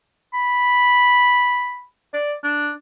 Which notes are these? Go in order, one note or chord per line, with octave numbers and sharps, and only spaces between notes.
B5
D5
D4